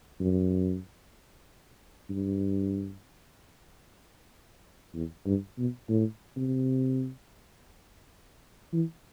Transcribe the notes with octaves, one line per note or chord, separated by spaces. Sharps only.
F#2
G2
E2
G2
B2
A2
C3
E3